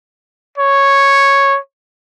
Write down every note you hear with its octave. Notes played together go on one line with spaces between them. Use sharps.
C#5